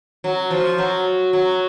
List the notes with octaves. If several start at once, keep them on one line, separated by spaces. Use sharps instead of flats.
F#3
F3
F#3
F#3